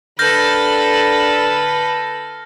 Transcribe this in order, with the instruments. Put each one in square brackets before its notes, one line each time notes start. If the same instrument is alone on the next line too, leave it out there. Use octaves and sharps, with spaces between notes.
[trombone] D3 [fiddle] A4 B4 [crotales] F6 G6 A#6